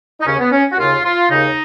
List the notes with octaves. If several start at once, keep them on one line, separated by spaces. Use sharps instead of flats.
D#4
D#2 C#3 C#4
B3
C#4
F#4
D#2 C#3 F4
F4
D#2 C#3 D#4